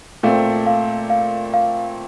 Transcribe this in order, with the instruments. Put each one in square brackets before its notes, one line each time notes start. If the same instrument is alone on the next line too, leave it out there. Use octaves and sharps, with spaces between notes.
[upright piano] A#2 A3 C4 [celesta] F5
[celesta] F5
F5
F5